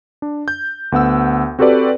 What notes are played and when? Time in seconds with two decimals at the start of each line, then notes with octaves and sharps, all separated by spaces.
0.22 D4
0.48 G6
0.92 D2 B3 F#5 E6
1.59 C4 F#4 G4 A4 B4 D5